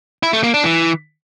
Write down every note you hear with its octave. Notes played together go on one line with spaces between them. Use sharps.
E4
A3
A#3
D4
E3